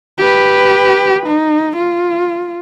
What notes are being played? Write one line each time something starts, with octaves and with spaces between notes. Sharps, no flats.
G4 B4
D#4
F4